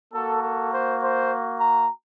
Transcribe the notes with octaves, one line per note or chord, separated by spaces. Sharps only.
A#3 F#4 A4
A4
C5
C5
A#5